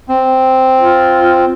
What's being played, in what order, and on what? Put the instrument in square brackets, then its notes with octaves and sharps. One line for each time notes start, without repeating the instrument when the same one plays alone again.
[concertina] C4
[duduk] F4